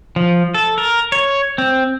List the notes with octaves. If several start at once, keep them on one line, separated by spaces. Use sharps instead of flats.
F3
A4
A#4
C#5
C4